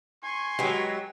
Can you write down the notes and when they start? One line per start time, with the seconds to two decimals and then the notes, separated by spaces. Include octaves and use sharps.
0.23 G#5 C6 C#6
0.59 F#3 G#3 B3 G4